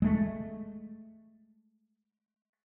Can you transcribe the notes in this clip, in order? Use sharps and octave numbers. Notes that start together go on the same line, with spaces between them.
G#3 A3